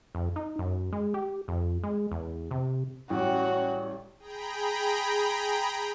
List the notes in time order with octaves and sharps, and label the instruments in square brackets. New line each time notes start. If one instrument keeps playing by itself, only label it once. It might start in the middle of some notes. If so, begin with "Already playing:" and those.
[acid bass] F2
D#4
F#2
G#3
G4
F2
G#3
E2
C3
[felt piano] A1 [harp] G3 [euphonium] C#4 [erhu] F#4
[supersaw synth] G#4 G5 A#5 B5